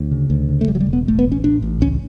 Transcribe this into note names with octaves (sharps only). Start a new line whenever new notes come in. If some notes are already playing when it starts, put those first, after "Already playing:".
Already playing: D2
C#3
D2
C#3
A3
E1 G3
F#3
G3
E1
B3
A1 A3
B3
A1
C#4
A2 D4
A1
C#2 C#4